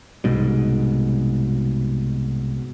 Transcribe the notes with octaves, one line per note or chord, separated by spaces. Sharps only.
C2 G#2 B2